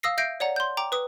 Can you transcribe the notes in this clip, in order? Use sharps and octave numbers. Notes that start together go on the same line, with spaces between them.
F5 D#6 E6 A#6 C7
E5 G6 A#6 C7 D7
C#5 D5 F#5 A#5
C6 G6
G5 A#5 D6
B4 D#6